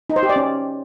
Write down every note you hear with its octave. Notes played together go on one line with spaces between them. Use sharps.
D#4
C5
G4
D5
C#4